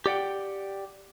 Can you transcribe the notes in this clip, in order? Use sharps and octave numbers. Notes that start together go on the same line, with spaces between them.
G4 D5 F#5 G5